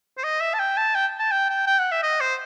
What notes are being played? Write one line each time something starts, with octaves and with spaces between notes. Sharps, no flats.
C5
D#5
E5
A5
G5
A5
G5
A5
G5
G5
G5
F#5
E5
D#5
C5